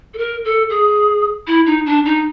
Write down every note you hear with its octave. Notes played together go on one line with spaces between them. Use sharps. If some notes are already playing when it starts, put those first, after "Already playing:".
A4
A#4
A4
G#4
E4
D#4
D4
D#4